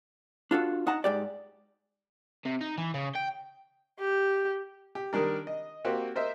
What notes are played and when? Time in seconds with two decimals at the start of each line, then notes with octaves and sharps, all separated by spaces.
0.51 D4 F4 F#4 A4
0.87 D#4 F#5 A5 A#5
1.04 G#2 G4 D5
2.45 C3
2.61 D#4
2.78 E3
2.94 C#3
3.15 G5
3.99 G4
4.95 G4
5.13 D#3 G3 D4 A#4
5.47 D#5
5.85 A#3 C4 F#4 G4
6.16 A#4 C5 D#5 E5